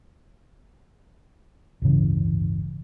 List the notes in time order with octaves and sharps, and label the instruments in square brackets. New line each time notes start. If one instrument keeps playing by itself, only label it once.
[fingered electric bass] D1 G1 C#3 E3